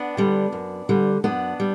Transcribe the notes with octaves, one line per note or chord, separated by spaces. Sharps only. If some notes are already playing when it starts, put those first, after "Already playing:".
Already playing: B3 D4
D3 G3
F#2
D3 G3
F#2 B3 D4
G3